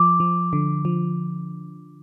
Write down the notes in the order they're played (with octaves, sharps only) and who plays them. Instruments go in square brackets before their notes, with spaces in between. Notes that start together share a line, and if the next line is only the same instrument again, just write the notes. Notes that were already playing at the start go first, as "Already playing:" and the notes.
Already playing: [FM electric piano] F3 [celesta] D6
[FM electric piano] F3
D3
F3